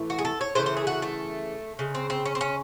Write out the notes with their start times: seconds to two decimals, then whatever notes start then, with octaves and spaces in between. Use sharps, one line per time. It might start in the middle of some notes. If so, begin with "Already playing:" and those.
Already playing: A2 E3 A3
0.10 F#4
0.19 G#4
0.25 A4
0.41 C#5
0.55 C#3 E3 A3 C5
0.66 C5
0.77 G#4
0.87 F#4
1.02 A3
1.79 C#3 G#3
1.95 C4
2.10 C4
2.26 C#4
2.35 C4
2.41 C#4